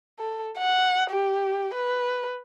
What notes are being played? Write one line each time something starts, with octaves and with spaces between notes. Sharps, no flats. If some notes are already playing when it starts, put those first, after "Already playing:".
A4
F#5
G4
B4